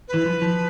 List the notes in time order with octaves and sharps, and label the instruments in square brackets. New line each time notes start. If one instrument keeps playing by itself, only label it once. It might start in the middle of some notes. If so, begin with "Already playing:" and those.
[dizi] B4
[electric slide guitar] E3
F3
F3